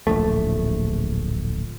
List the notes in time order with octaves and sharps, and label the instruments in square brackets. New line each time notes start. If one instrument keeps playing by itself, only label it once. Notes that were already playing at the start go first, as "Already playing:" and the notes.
[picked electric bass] D1 A#1 A3